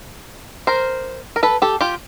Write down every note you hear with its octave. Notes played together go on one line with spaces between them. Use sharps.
A#4 C5
A#4
A4 B4
G4 A4
F4 G4